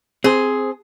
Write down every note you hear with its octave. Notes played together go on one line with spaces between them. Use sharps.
C4 G#4 C5